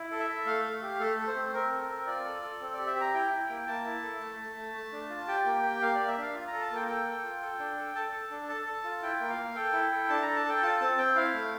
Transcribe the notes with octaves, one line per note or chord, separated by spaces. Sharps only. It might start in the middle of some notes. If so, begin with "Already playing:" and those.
Already playing: E4
A4
E5
A4
A3 F5
A3
G4
A3 A4
A3
C5
C4
C4 A#4
A4
C4
F4 D5
A4
A4
C4
G4 D5
E5
G4
A#5
E4 G5
E4
A#3
A#3 A5
E4
A4
A3
A3
A3
A3
D4
F4
G4 G5
A#3
G4
A#3 F5
A#3 D5
E5
D4 F5
F4
A#5
A4
A5
A#3 G5
A4 G5
A4
F4
A4
D4
A4
A4 A5
A4
D4
A4 A5
A4
F4
E4 G5
A#3
F5
A#3
A4 G5
E4
A4
D4 A5
A4 A#5
A5
A4 G5
F4 A5
C4 A5
C4 G5
E4 F5
A3